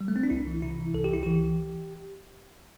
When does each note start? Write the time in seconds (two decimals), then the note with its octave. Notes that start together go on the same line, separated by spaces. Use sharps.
0.01 G3
0.08 A3
0.16 C4
0.23 D4
0.30 C2 E4
0.47 E3
0.62 C3 E4
0.79 E3
0.94 C2 A4
1.04 G4
1.10 C2 E4
1.23 E3 G4